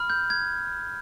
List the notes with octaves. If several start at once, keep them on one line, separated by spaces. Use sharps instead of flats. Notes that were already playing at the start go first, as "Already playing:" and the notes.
Already playing: B5 F6
G6
G#6